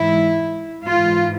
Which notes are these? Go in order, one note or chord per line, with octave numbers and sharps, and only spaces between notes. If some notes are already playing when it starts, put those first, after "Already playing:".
Already playing: G#2 E3 E4
G#2 E3 F4